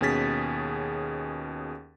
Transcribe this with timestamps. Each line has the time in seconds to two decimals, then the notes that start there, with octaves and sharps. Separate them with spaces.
0.01 D#2 B2 C#4 G#4 A6 B6